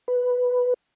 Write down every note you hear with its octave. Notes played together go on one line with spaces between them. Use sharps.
B4